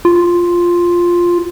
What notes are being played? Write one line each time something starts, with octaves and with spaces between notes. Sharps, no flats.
F4